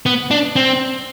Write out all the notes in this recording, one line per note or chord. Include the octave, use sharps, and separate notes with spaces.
B3
D4
C4